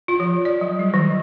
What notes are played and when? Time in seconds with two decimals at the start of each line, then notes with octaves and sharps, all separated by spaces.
0.08 F4
0.20 F3
0.45 D5
0.61 F#3
0.79 G3
0.94 D#3